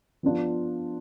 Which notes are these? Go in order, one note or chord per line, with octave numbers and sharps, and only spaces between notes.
F3 B3 D4 F4